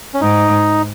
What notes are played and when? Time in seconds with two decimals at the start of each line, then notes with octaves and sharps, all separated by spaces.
0.14 C#4
0.21 G#2 D#4